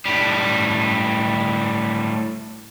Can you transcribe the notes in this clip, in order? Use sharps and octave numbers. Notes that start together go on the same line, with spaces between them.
A2 G3